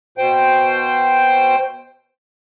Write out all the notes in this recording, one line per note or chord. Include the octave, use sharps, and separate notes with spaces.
B2 C5 G5